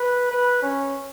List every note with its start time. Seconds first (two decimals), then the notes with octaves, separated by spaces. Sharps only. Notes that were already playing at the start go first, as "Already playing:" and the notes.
Already playing: B4
0.31 B4
0.62 C#4